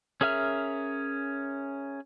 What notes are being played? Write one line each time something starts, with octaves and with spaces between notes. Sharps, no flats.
C#4 G#4 A#4 E5 F6